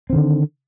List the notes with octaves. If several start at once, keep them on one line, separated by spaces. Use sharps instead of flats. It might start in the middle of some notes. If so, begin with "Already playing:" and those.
D3 D#3 C4